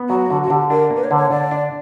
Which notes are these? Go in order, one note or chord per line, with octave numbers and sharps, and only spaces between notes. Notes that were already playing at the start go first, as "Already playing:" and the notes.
Already playing: B3
F#3 F#4
D3
F#4
D3 G4
D4 A#4
A#3
B4
C#5
D3
C#5
D3 D5
D4